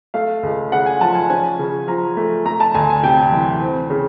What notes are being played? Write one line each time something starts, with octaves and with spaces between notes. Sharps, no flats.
A3 F5
C#2
C#3 F#5
G#5
F3 A5
G#5
C#4 G#5
C#3
F3 A#5
A3
A3 A#5
A5
D2 G#5
G#5
C3 G5
E3
C4
C#3